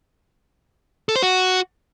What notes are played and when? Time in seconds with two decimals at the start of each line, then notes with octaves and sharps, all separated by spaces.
1.09 A4
1.16 C5
1.23 F#4